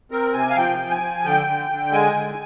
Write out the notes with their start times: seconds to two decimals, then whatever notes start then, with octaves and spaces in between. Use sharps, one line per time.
0.11 C4 A#4
0.34 C3 G#5
0.50 F5
0.56 F3 G5
0.79 F3
0.91 G#5
1.01 F3
1.25 D3 G5
1.47 D3
1.70 D3
1.92 G#3 G#5
2.15 D3